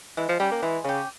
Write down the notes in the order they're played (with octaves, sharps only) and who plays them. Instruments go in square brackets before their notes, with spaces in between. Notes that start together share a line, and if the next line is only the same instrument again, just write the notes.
[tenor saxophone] E3 [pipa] G#3
[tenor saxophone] F3
[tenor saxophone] G3 [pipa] C#4 G4
[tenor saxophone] A#3
[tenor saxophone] E3 [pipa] G#3
[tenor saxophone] C#3 [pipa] C#4 G4